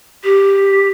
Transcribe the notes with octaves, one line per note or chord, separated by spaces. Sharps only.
G4